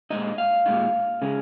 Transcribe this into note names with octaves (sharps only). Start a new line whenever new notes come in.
A#2 G#3 D#4 D#5
F5
A#2 G#3 D#4
C#3 G#3 D#4